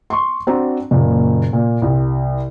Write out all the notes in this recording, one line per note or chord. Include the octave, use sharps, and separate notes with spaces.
C6 C#6
C4 D4 F#4 A#5
F#1 A#2
A#2
C2